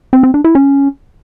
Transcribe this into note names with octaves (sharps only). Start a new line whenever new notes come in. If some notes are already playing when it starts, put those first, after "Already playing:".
C4
C4
D4
E4
C#4